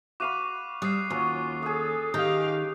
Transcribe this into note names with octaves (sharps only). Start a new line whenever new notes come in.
F#4 F5 B5 D6 D#7 F7
G3 D#6 F#6 C7
D#2 F#3 C#4 F4
G#4 A4 D#6
D#3 D#4 G4 F5